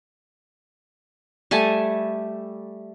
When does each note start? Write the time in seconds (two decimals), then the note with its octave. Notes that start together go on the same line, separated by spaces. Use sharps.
1.51 G3 A3 G#5 A5